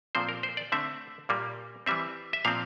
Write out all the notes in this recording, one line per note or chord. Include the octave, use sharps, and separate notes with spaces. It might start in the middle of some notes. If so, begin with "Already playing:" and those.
A#2 F3 C4 C5
A#4
C5
D5
D3 A3 C4 E5
A#2 G3 A#3
E3 G3 C4 E5
E5
A#2 F3 C4 F5